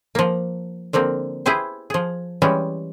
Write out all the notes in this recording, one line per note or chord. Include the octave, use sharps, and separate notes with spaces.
F3 A#3
D3 F3 A#3 C4
E4 G4 G#4 B4 C5
F3 G#4
E3 G3 G#3 C#4